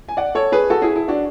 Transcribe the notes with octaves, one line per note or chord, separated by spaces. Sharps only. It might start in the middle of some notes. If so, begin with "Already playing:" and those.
G#5
D5 F#5
A4 C#5
G#4 B4
F#4 A4
E4 G#4
E4
D4 F#4